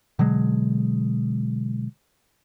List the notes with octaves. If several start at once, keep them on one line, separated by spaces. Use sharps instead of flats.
B2 D3 F#3 G#3